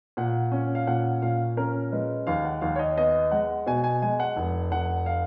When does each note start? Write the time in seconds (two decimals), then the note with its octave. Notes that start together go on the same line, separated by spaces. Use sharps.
0.17 A#2 F#5
0.52 C#4
0.75 F5
0.87 A#2 F#5
1.22 A#2 F5
1.57 C#4 A#4
1.92 G#3 B4
2.27 D#2 F5
2.45 F#5
2.61 D#2 F5
2.76 C#5
2.79 D#5
2.97 B3 D#5
3.32 G#3 F#5
3.66 B2 G#5
3.84 G#5
4.02 G#3 G#5
4.20 F#5
4.36 F1
4.71 F1 F#5
5.06 F5